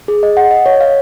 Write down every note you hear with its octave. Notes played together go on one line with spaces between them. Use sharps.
G#4
D#5
F#5
D#5
C#5
F5